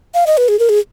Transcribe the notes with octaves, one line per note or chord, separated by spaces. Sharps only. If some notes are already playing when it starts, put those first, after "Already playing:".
F5
D#5
B4
G#4
A#4
G#4